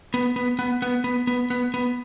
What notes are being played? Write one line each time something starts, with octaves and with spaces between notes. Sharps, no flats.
B3
B3
B3
B3
B3
B3
B3
B3